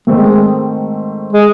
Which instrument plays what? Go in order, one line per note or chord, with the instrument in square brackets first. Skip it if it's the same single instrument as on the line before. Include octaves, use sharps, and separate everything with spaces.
[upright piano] G#2 D#3 A3 C4 [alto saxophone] G#3
[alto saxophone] G#3